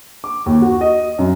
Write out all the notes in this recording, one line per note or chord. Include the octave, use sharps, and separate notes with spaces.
D6
D#2
F#4
D#5
F#2